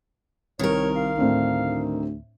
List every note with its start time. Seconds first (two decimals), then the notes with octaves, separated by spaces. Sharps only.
0.59 C2 D#3 A#4 C#5
0.96 F5
1.18 D2 A2 C4 D4